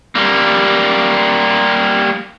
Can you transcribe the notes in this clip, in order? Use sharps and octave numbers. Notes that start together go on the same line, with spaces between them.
G3 A#3